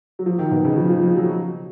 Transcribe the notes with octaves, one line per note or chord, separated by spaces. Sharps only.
F#3
F3
D#3
B2
C#3
F3
F3
F3
F#3